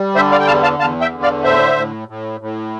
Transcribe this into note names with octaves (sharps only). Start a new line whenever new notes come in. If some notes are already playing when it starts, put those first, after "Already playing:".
Already playing: G3
D3 C5 E5
D5 F5
G5
E2 F5 A5
F5 A5
E2 F5 A5
E5 G5
D3
D5 F5
A2 C5 E5
A2
A2
A2